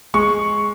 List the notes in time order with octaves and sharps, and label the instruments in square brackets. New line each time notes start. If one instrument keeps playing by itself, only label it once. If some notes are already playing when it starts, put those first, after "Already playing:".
[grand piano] G#3 C#6